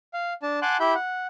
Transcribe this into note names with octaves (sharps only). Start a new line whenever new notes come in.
F5
D4 A5
F#5 G#5 A5 C6 D6 F#6
E4 G4 E5 B5 G6
F#5